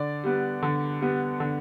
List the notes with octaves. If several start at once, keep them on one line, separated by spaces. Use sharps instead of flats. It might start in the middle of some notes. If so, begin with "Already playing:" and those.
Already playing: D3 D5
G3 B3
D3
G3 B3
D3